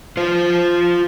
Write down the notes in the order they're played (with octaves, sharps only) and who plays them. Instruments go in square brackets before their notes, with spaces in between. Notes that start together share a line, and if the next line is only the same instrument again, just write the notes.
[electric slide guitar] F4 C5